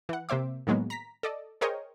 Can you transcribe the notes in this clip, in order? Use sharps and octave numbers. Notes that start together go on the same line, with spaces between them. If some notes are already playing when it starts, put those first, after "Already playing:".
E3 F#5
C3 A#3 C5 E5 D6
A2 D#3 F#3 G#3 A#3 B3
A#5 B6
A4 D5 D#5
G#4 A#4 C5 C#5 D#5 G5